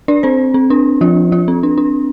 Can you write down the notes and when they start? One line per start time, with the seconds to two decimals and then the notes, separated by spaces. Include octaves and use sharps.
0.08 D4 D5
0.23 C4 C5
0.54 C4
0.70 D4
1.01 F3 F4
1.32 F3 F4
1.48 C4
1.63 D4
1.78 D4